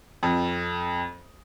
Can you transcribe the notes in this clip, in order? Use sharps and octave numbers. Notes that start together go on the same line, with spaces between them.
F2